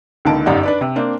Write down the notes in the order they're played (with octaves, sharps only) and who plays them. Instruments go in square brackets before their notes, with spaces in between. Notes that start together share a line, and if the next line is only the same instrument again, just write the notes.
[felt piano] C#2 D3 D#3 A#3 A5 D7
G1 F#2 D#4 G4 D5 F#5
D4 B4 D5
C3
A#3 C4 D4